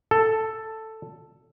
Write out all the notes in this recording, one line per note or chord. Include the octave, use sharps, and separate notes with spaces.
A4